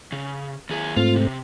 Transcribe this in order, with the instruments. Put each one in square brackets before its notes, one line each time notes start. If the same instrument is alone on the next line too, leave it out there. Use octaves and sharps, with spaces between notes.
[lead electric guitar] C#3
D#2 G#4
[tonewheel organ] G#2 A3 C4 [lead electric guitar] F4
[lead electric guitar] C3